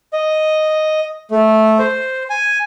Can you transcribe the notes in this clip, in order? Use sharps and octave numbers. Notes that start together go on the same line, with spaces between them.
D#5
A3
C5
G#5